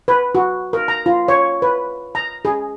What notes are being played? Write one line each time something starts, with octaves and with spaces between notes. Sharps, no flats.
B4
F#4
A#4
A#5
F4
C#5
B4
A#5
G#4